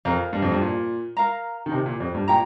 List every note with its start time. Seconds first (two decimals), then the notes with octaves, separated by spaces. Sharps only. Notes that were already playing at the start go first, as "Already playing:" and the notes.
0.05 F2 A#4 F5 A#5
0.33 G2
0.42 F2
0.52 G2
0.61 A#2
1.17 A#4 F5 A#5
1.66 D#3
1.72 C3
1.86 A#2
2.00 F2
2.14 G2
2.28 A#2 G5 A#5